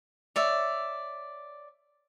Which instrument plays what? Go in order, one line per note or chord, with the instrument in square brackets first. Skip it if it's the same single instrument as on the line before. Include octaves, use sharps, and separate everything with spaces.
[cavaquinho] C#5 D5 E5